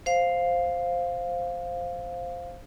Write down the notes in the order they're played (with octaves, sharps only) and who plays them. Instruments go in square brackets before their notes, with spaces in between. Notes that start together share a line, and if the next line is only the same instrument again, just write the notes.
[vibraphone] C5 F5